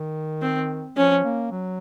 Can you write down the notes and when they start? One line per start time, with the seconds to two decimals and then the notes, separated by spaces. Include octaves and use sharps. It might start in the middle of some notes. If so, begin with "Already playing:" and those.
Already playing: D#3
0.42 C4
0.96 F3 C#4
1.24 A#3
1.51 F#3